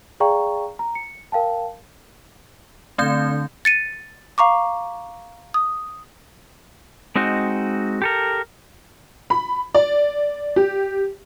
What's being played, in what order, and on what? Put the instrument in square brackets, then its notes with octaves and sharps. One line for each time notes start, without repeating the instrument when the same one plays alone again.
[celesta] G#4 D5 F5 G5 A#5 C#6
A#5
C#7
A#4 F5 G5 A5
[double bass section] D3 [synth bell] A3 C4 G6
[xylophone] A6 C#7 D#7
F5 A#5 C#6 D6
D#6
[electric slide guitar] G#3 C4 D#4 F#4
G4 A4 A#4
[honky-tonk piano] B5
D5
G4